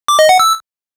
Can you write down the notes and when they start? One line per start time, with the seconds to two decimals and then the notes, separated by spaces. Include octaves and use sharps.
0.08 D6
0.19 D#5
0.29 F#5
0.40 E6